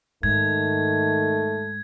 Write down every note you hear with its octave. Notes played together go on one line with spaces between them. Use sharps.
G#2 D#3 A3 G#6